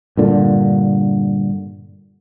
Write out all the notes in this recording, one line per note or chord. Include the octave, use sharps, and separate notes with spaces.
G2 A#2 D3